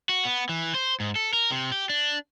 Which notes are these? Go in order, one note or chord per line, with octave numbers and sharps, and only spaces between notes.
F#4
B3
E3
C5
G#2
A4
A#4
C3
G4
D4